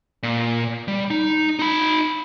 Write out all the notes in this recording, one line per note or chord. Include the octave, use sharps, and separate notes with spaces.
A#2
G3
D#4
D#4 B5